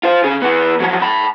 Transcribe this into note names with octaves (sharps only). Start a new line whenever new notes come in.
F4 C5
C#3 G#4
E3 B3
F3 F#3
A5 B5